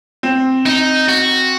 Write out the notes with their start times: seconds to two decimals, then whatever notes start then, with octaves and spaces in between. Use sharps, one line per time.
0.23 C4
0.66 D#4
1.09 F#4